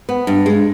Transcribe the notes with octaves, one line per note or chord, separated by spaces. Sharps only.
B3
G2
G#3